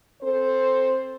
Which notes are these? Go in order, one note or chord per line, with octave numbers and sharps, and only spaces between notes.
C4 A4 C5